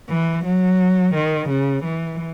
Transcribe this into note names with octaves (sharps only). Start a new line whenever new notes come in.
E3
F#3
D#3
C#3
E3